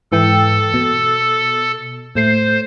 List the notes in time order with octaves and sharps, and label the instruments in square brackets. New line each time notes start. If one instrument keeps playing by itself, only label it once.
[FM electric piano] G#2 E3 G5 [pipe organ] A4
[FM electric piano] B2
[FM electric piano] A2 A3 C7 [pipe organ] C5